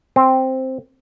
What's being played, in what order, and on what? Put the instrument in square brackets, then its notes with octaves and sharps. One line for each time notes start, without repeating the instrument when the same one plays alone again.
[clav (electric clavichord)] C4